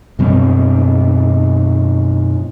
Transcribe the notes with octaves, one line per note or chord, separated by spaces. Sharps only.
F#2 B2 G3 C4